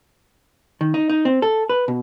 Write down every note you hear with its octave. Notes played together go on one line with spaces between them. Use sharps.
D#3
D#4
D#4
C4
A4
B4
B2